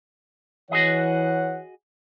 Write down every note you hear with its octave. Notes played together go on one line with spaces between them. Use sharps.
E3 F#4 G#4 C#5 D#5 F#5